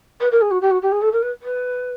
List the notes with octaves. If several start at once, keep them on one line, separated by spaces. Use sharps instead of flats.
B4
A#4
G#4
F#4
G4
F#4
G4
G#4
A4
A#4
B4
B4